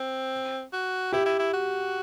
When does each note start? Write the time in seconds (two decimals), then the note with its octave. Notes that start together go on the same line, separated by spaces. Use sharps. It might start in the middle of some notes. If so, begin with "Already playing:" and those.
Already playing: C4
0.73 F#4
1.13 E4 G4
1.26 E4
1.39 E4
1.53 F#4